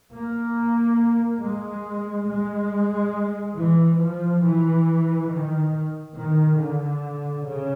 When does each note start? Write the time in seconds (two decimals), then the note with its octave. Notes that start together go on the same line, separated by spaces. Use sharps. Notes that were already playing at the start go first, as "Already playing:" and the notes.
0.12 A#3
1.40 G#3
2.28 G#3
3.56 E3
4.00 F3
4.43 E3
5.30 D#3
6.16 D#3
6.58 D3
7.44 C#3